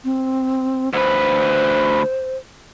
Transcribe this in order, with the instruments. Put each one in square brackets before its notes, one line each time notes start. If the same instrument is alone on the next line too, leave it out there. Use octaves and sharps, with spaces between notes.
[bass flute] C4
[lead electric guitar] D2 B4 [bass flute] C5